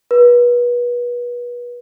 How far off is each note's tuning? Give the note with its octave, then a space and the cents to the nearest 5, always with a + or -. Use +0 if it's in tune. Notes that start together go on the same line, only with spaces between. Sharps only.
B4 -30